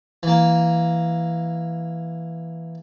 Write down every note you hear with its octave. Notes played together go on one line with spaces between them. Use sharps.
E3 A#3